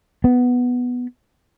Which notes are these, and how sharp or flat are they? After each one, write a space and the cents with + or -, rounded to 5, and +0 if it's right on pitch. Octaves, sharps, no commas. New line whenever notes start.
B3 +0